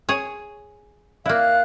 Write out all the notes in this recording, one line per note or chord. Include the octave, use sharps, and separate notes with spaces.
G#4 C#5
A#3 E4 D5 F5 F#6